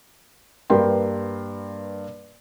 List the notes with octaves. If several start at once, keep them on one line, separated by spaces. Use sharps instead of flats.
G2 A#3 A#4 B4 G5 C6